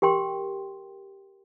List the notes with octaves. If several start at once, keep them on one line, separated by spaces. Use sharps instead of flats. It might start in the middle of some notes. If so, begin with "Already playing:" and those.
G4 A#4 G5 C6